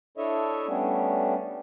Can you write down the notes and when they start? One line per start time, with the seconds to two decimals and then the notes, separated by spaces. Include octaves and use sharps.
0.17 D4 E4 A4 C#5 D#5 E5
0.67 G3 A3 B3 C#4 D4